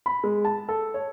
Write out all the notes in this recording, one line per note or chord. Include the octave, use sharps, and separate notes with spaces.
B5
G#3
A5
A4
C#5